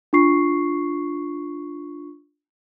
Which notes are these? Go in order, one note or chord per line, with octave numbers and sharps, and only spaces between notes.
D4 F4 C#6 C7